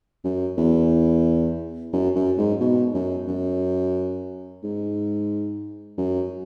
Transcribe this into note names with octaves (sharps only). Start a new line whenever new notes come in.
F#2
E2
F#2
F#2
G#2
B2
F#2
F#2
G#2
F#2